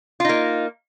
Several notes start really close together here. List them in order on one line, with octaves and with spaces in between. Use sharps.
F4 D#4 A#3